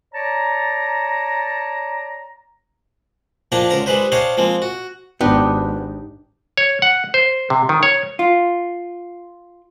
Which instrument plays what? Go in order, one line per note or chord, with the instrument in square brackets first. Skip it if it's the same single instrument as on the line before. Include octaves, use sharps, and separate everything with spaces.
[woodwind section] C#5 D5 A5 A#5
[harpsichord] A#2 F3 A#3 D4 G5 A#5
C#2 D3 A#4 A#5
D#3 G3 G#3 B4 C5
D4 C5 C#5 D#5 F5 G5
F3 G#3 A#3 C4
F#4
[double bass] G#1 [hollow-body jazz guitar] B3 [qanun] D4 D#4 G4
[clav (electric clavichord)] C#5
F#5
C5
C3
D#3
C#5
[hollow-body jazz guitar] F4